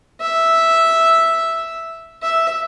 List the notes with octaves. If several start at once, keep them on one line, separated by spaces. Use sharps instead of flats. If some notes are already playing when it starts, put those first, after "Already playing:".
E5
E5